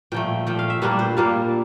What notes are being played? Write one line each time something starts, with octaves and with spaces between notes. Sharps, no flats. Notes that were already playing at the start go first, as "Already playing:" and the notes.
A#2 F3 A3 G5
A#2 F3 A3 G5
F5
E5
A#2 G3 A#3 D4 B4
C5
A#2 G3 A#3 D4 F5